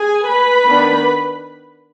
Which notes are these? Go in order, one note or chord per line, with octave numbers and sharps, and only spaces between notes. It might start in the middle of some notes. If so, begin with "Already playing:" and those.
Already playing: G#4 G#5
B4 B5
D#3 B3 D4